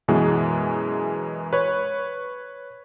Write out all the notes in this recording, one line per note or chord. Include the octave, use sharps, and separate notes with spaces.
F#2 B2 E3 G#3
B4 C#5